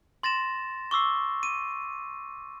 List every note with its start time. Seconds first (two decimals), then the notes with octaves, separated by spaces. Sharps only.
0.23 C6 A6 A#6 E7
0.91 C#6 D6 E6 C7
1.43 D#7